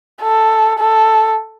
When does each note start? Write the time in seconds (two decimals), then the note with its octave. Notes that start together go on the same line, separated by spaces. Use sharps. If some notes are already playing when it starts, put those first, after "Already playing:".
0.23 A4
0.79 A4